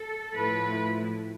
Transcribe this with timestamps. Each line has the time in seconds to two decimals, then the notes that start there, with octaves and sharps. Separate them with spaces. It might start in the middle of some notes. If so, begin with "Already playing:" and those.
Already playing: A4
0.33 A2 F3 A3 E4 B4